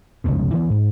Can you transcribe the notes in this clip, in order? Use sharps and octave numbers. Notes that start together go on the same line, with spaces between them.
F1 C#2 G2 B2
D2 E3 B3
G#2